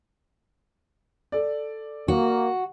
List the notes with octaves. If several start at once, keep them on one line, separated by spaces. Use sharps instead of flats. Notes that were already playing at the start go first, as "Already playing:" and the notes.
A4 D5
A#3 F#4